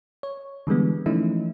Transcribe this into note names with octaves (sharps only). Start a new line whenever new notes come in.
C#5
D3 E3 G3 G#3 B3
E3 F3 A3 C#4 D#4 E4